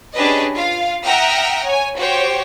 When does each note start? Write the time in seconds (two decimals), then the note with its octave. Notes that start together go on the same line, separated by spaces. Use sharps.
0.15 C#4 D4 G4 G#4 B4 D#5
0.54 F4 F5
1.04 E5 F#5 G5 A#5 D#6 F6
1.65 C#5 G#5
1.97 F#4 G4 C5 C#5 G5